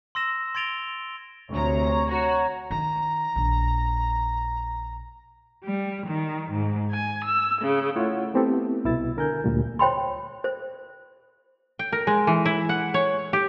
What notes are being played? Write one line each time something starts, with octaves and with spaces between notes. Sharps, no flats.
C6 E6 A#6 E7
C6 G#6 A6 D7 F7 G7
D2 C3 C#5 A#5
F#4 C#5 A#5
D#3 A#5
A#1
G3
D#3
G#2
G#5
E6
C#3
A3 E4 F4 C#5 F#5
A3 B3 C4 E4 G4 A4
C2 B2 E4 E6 A6
D3 A#4 G#5 G6
D2 A#2 G3
C5 C#5 G5 B5 C6
C5
G5
A#4
G#3
E3
E4
F#5
C#5
G4